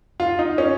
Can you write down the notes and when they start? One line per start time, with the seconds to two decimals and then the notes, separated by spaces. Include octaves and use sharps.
0.20 F4
0.39 D#4
0.58 C#4